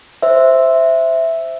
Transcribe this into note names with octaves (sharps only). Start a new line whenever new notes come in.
C5 E5